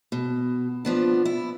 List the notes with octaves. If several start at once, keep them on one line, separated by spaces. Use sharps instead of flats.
B2
F3 B3 D4
E4